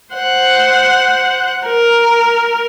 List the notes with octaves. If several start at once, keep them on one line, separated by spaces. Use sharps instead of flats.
C5 F#5
A#4